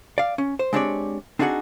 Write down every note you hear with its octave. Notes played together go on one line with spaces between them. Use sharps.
D5 F5
C#4
C5
G#3 C4 D4 G4 C#5 D5
C4 D4 D#4 F#4 G#4 F#5